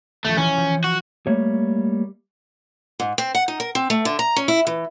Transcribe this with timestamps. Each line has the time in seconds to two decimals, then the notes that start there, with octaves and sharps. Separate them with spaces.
0.25 D#1 F3 A3
0.37 E3 C#4
0.57 F3
0.84 F#4
1.27 G3 A3 A#3 C#5
3.00 G#2
3.18 C4
3.35 F#5
3.48 D#4
3.60 A#4
3.75 C4
3.90 A3
4.05 D3
4.19 A#5
4.36 C#4
4.48 E4
4.67 E3